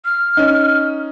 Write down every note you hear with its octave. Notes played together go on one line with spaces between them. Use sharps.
F6
C#4 D#4